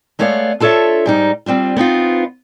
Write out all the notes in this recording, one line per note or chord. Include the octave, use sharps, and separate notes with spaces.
G#3 A3 B3 C#5 D5 F5
D4 F4 A4 B4 C#5 E5
G#2 G3 D#4
G3 C4 D4 F4
B3 C4 D#4 F4